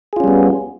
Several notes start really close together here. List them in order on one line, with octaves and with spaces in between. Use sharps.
G#4 F4 C#4 G3 B3